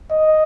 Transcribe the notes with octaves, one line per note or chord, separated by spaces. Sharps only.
D#5